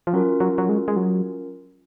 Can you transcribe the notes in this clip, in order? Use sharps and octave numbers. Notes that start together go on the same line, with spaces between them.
F3
F#3 C#4 F4 A#4
F#3
F#3
G#3
G#3
F#3